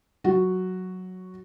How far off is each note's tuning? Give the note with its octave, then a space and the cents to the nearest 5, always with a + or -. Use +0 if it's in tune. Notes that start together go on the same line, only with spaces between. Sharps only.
F#3 +0 F#4 +0